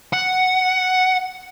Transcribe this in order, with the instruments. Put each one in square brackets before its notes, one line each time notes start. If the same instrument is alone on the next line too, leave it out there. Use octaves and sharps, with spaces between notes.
[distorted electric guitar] F#5